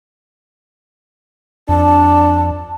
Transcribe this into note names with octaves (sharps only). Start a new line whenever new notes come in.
F2 D4 A5